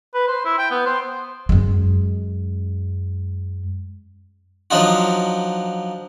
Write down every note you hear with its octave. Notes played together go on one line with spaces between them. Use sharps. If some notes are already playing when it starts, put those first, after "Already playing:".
B4
C5
E4
G5
B3
C5
F#2 G#3
F3 F#3 D4 D#4 F4 F#4